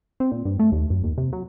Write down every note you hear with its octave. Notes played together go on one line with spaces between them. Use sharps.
C4
A#2
G2
A3
D#2
F#2
D#2
C3
F#3